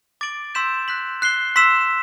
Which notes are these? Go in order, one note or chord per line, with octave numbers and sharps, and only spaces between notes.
D6 A6 D7 F#7
C6 E6 G6 B6 E7
F#6 B6 F#7
F#6 C7 G7
C6 E6 B6 E7